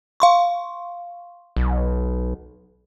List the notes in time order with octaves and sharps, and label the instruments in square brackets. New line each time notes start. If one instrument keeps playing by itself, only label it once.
[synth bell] F5 C6 C#6
[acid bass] B1